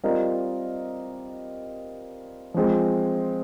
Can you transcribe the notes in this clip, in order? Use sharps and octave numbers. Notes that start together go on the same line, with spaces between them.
G3 C4 F4 A#4 D#5
F3 G#3 C4